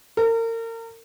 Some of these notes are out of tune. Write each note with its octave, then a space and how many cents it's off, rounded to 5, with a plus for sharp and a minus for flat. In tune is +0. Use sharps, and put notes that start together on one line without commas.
A#4 -35